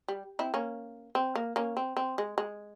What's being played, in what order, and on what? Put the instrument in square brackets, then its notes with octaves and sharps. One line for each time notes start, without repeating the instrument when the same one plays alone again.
[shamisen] G3
C4 E4
A#3 C#4
C4
A#3
A#3 C#4
C4
C4
G#3
G#3